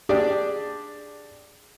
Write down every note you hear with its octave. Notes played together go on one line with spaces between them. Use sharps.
D4 G4 G#4 D5